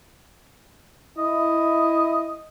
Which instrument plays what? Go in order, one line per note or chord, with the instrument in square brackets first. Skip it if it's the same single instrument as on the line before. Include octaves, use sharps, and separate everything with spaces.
[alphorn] E4 [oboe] D#5